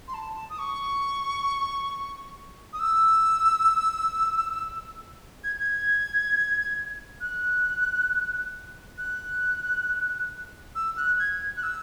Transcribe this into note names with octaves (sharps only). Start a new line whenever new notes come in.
C6
A5
D#6
C#6
D#6
E6
G#6
G#6
F#6
F#6
E6
F#6
G#6
F#6
E6